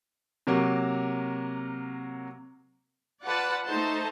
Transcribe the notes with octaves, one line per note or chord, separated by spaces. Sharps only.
C3 F#3 A#3 A#4
F4 B4 D5 F#5 A5
A3 D#4 C5 A5